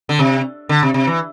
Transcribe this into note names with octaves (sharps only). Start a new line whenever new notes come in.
D3
C3
D3
C3
C3
E3